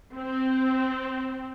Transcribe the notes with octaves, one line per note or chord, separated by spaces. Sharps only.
C4